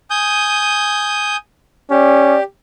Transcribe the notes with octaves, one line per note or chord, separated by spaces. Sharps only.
G#5 D#6 G6
C#4 G4 D5